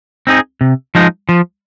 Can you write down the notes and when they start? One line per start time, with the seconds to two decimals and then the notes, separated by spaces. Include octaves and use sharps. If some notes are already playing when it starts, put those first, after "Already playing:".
0.27 C4 D#4 G#4
0.61 C3
0.95 F3 G#3 D#4
1.29 F3